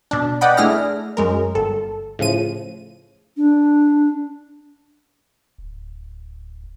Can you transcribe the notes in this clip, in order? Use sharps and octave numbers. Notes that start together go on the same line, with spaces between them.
B2 D4
B4 D5 D#5 F#5 G5 B5
A3 D4 E4 G#4 F6 A#6
F#2 G#3 A#4
G1 A4
A2 C#3 F3 D#7
D4
D1